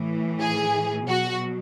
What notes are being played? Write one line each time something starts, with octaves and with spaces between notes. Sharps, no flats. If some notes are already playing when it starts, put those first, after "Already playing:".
Already playing: A2 E3
G#4
B2 F#3 F#4